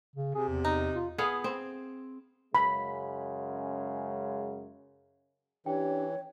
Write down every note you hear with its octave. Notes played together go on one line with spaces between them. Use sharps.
C#3
C3 G#4
E2
D#4
F4
B3 G#4 F5
C4
F#2 C#3 G#3 B5
E3 C#4 D4 G4 C#5 G5